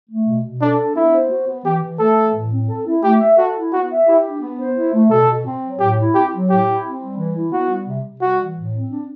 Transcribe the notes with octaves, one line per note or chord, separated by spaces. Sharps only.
A3
B2
B2
D4 A4
D4
B3 E4
C5
F#4
B3
E3 G4
E3
A3 A4
E3
A2
C4
A4
E4
A3 G4
E5
F#4 A4
E4
B3 F#4
E5
E4 G4
D4
B3
C5
E4
A3
B2 A4
B2
C4
F#3
A2 G4
E4
C4 G4
F#3
A2 G4
E4
C4
G3
E3
E4
B3 F#4
G3
C3
C3
G3 F#4
E3
A2
C4
D4